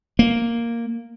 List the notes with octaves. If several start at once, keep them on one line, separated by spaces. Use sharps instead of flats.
A#3